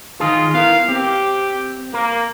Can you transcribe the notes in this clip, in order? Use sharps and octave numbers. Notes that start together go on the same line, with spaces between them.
D#3 D#4 F4 G#4
B3 E4 A#4 F5
C4 G4
A#3 A#4